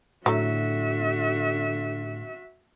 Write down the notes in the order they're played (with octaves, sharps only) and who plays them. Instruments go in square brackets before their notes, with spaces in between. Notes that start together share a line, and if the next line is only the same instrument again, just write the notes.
[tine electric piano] A2 [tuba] D3 [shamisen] F#3 A3 [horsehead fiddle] F#4 E5